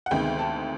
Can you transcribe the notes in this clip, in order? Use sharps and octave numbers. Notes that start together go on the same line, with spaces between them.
F#5
D2 C3 D#3 G#3 B3 G5
A5